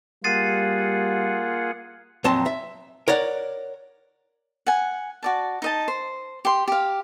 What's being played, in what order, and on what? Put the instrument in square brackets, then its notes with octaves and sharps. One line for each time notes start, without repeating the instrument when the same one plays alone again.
[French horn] G3 [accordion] A#3 [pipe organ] F4 G#4 F#5 [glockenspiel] A6 C7 D#7
[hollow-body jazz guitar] F2 A#2 F#3 C4 A5 C6
E5
A#4 C#5 D5 F#5
[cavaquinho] F#5 G#5
F#4 D5 A5
D#4 D#5 A5
C5
G4 C6
G4 F5